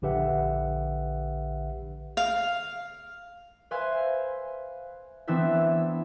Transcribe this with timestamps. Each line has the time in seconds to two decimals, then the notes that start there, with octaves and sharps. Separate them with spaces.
0.02 A#1 D3 G4 B4 E5 F#5
2.17 F5
3.71 B4 C5 E5 F5 G#5
5.27 E3 B3 C4 D4 E4 E5